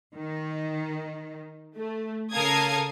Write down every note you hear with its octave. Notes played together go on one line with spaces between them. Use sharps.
D#3
A3
C#3 A4 A#4 F5 D#6 G#6